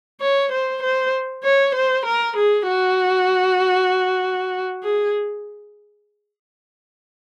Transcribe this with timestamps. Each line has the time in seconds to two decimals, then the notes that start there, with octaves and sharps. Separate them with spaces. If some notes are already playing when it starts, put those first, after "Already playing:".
0.21 C#5
0.52 C5
0.83 C5
1.44 C#5
1.75 C5
2.05 A#4
2.36 G#4
2.68 F#4
4.83 G#4